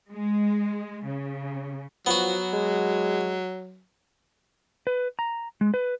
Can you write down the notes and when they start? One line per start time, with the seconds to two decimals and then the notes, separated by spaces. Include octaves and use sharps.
0.11 G#3
1.04 C#3
2.06 F3 F#3 B3 F#4
2.53 G#3
4.87 B4
5.19 A#5
5.61 G#3
5.74 B4